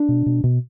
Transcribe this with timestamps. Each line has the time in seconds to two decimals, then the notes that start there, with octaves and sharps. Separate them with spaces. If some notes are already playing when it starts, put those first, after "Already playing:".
Already playing: D4
0.09 B2
0.26 B2
0.44 B2